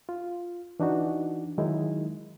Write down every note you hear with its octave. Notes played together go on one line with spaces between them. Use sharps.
F4
E3 D4 D#4 F#4
D#3 F#3 G#3 D#4 E4